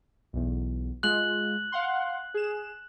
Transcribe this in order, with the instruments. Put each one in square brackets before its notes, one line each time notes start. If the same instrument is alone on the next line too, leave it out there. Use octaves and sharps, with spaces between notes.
[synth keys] B1 E2
[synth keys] G#3 F4 [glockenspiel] F#6 F#7
[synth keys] F5 F#5 C6
G#4 E7